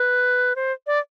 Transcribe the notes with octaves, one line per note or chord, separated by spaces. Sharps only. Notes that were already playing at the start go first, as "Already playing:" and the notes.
Already playing: B4
C5
D5